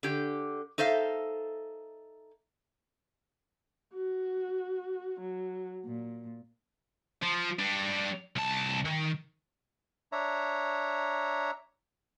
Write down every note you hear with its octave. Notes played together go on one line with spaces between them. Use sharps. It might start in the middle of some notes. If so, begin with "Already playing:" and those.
D3 G4
D#4 A4 C5 E5 F5
F#4
F#3
A#2
F3
G3 D4
C2 A5
D#3
D4 C#5 E5 A#5